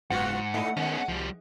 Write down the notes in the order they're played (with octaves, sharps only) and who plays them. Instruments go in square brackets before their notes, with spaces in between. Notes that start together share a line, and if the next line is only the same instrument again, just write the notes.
[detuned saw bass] F#1 [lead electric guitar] G#2 [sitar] B3 F4 F#4 [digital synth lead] F#5
[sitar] A2 D#4 E4 [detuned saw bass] A3
[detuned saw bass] D#3 [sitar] G#3 [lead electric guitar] B3 C#4
[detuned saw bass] C2 [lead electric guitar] F3 G3